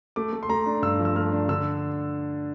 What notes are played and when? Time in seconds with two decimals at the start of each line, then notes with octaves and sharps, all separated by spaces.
0.16 A3 D6
0.33 A3
0.43 C6
0.49 A3 A#5
0.66 D4
0.82 G2 E6
0.99 F3
1.05 E6
1.15 A3 F6
1.32 D4
1.49 D3 E6